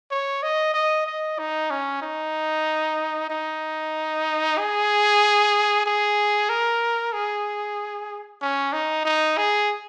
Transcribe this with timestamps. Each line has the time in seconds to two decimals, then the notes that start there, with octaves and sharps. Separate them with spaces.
0.11 C#5
0.43 D#5
0.74 D#5
1.06 D#5
1.39 D#4
1.70 C#4
2.02 D#4
3.30 D#4
4.58 G#4
5.86 G#4
6.49 A#4
7.13 G#4
8.42 C#4
8.73 D#4
9.05 D#4
9.37 G#4